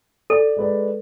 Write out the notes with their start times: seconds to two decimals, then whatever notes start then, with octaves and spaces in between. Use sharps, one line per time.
0.30 A4 D5
0.57 G#3 B4 D5